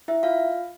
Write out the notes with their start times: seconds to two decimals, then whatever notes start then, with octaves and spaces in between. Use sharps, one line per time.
0.08 E4 E5
0.23 F4 F5